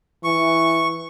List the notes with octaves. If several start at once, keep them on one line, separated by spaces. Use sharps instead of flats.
E3 C#6